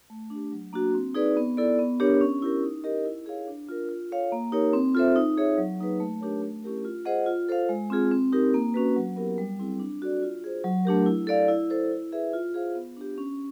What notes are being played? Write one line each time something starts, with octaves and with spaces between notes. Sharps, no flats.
A3
D4 G4
F#3
A#3 D4 F#4
C4
D#4 G#4 B4 D5
B3
E4 A4 D5
B3
D4 G4 A#4 C#5
C#4
E4 G4 A#4
D#4
G4 A#4 D#5
E4
G#4 C#5 F5
D4
F4 A#4
F4
A4 C#5 F5
A#3
D#4 G4 A#4 C#5
C4
F4 A4 C5 E5
D#4
G#4 C#5 E5
F#3
A#3 D#4 G#4 B4
A3
D4 G4 A#4 C#5
A3
C#4 E4 G4 A#4
F4
G#4 C5 D#5 F#5
F4
A4 C5 F5
G#3
C4 F4 G#4
C4
D#4 G4 A#4
A#3
C#4 F#4 B4
F#3
B3 E4 G4 A#4
G3
C4 E4 G#4
D4
F#4 A4 D5
F4
G#4 C5
F#3
A3 D4 G4 A#4
E4
A4 D5 F5
E4
A4 C5
E4
G#4 B4 E5
F4
G#4 C5 F5
B3
D4 G4
C#4